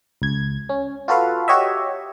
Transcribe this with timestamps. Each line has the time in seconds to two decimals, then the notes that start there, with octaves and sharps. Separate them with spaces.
0.22 C#2 G#6
0.69 C#4
1.08 F4 F#4 A4 B4 F5
1.48 F#4 G4 C#5 D#5 E5